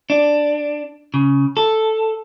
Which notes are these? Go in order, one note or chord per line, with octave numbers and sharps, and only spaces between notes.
D4
C#3
A4